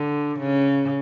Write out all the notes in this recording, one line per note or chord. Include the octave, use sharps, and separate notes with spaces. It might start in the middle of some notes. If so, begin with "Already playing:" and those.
Already playing: D3
C#3